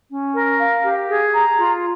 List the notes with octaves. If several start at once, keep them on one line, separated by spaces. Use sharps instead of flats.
C#4
A#4
F5
G4
G#4
A#5
F4